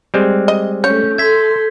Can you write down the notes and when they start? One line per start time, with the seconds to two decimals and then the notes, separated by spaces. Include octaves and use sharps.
0.14 G3 G#3 C4
0.48 D#5
0.84 A3 C#4 C#5 G6
1.18 A4 E5 C6 G#6 B6